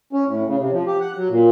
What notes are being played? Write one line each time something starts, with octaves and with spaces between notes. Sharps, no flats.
C#4
A2
C#3
C3
F3
G4
F#5
F#3
A#2